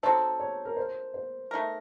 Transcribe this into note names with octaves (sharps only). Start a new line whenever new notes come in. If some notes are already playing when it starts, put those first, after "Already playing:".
F#3 C4 D#4 A4 C5
C#5
A#4
C5
C5
A3 D#4 A#4